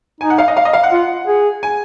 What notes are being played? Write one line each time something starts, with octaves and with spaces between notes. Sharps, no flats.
D#4 G#5
F#5
F5
D#5
F5
D#5
F5
F#5
F4
G#4
G#5